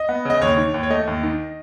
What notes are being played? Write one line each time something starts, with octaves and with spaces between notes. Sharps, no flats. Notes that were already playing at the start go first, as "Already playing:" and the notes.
Already playing: D#5
B3
C#3 D#5
D#2 C#5
D#3
D#2
C#5
A3 D#5
D#2
D#3